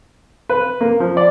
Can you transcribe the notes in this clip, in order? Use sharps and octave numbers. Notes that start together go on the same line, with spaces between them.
B4
A#3
F3
D5